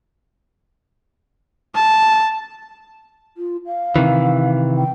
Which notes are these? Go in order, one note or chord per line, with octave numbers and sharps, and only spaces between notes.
A5
F4
F5
C3 D#3 E3
G5